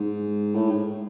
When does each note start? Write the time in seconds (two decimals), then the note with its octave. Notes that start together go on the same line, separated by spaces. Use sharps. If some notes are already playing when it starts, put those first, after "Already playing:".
Already playing: G#2
0.55 A2
0.71 G#2